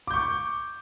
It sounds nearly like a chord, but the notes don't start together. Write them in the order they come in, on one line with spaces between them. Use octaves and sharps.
D6 G6 C#6